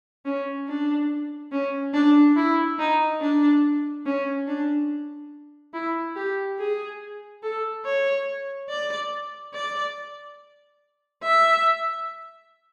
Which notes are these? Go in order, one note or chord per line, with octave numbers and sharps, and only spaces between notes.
C#4
D4
C#4
D4
E4
D#4
D4
C#4
D4
E4
G4
G#4
A4
C#5
D5
D5
E5